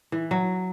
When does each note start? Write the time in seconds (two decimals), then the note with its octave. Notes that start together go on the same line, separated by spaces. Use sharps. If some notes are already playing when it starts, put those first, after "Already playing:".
0.12 E3
0.31 F#3